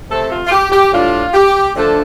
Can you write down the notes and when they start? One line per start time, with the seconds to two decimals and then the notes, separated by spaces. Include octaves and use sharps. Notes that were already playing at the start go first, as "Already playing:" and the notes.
0.09 C3 A3 C4 A4
0.30 F4
0.46 F4
0.51 G4
0.72 G4
0.92 A2 G3 D4 F4
1.34 G4
1.75 D3 F3 A3 D4 A4